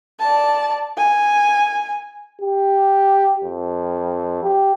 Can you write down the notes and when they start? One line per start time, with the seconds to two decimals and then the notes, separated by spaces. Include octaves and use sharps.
0.20 D5 A5
0.97 G#5
2.41 G4
3.44 F2
4.43 G4